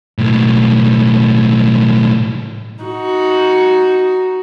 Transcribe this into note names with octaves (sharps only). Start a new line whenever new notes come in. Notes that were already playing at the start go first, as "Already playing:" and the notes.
B1 A2
D#4 F#4